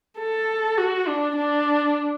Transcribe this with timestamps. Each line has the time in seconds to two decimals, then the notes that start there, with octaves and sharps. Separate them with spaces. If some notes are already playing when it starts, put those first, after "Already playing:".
0.19 A4
0.78 F#4
1.07 D4
1.37 D4